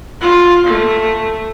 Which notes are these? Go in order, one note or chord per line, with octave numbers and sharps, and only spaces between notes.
F4
A3